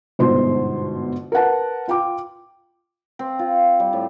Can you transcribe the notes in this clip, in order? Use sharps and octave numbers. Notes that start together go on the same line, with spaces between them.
G1 G#2 B2 C5 C6
A#4 B4 F#5 A5
F4 G5 D6
C4
F4
G3
A2